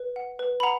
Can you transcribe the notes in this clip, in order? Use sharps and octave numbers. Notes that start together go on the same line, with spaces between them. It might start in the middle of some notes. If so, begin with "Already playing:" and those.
Already playing: B4
F#5
B4
B5
F#5 A#5